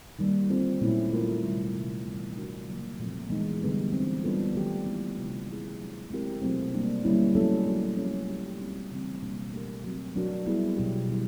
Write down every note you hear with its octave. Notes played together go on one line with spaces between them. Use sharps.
D#3 G3 A#3
D3 G3 C4 F4 A4
A#2 F#3 A3 C#4 E4
A3 C4 F4 A#4
C3 D#3 G3
C3 D#3 G3
E3 G3 B3
A3 D4 F#4 A#4
C#3 F#3 A#3
A#2 F3 A3 C4
E3 G#3 B3 D#4
D3 G3 B3 D#4 G4
E3 G#3 C4
G3 B3 D4 F4 A4
D#3 F#3 A3 D4 G4
G#3 B3 E4
C3 D#3 G#3 C#4 F4
G#3 C#4 E4 G#4
F#3 A3 D4
G#3 C4 E4 G4 A#4
B2 F#3 A3 C4 E4
G3 A#3 D4
D3 G3 A#3 C#4 E4
F#3 A3 C#4 E4 A4
F#3 A3 D4 F#4
F3 A#3 C#4 F#4 A4
F#3 A3 D4 G4
G3 C4 D#4 G4
C#3 E3 G3 C4
B2 G3 A#3 D4
A3 D4 G4 A#4
F#3 A3 C4
F#3 A3 D4 F#4 A#4
G3 B3 E4 G#4
B2 F#3 B3 E4 G4
D#3 G3 B3 E4